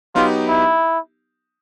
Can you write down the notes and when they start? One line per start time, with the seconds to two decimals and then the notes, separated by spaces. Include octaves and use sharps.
0.15 F#3 B3 D#4 F4 G4
0.48 E4